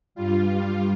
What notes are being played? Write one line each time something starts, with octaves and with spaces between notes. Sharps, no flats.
G2 G3 F4